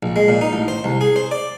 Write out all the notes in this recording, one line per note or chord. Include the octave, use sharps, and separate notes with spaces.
A#1
G#3
A#2
D#4
A1
C5
C2
G#4
C5
D5